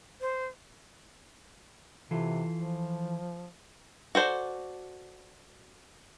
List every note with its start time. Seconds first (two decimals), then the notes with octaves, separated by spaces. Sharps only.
0.21 C5
2.11 C3 E3 F4 A4
2.59 F3
4.15 F#4 A4 C5 D5